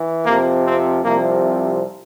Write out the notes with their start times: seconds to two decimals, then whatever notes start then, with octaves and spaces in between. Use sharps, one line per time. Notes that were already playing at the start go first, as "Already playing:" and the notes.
Already playing: E3
0.26 F2 C3 F3 A#3
0.65 C4
1.04 C2 C3 F3 A#3